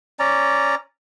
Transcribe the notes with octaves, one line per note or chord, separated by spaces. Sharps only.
C#4 D5 A#5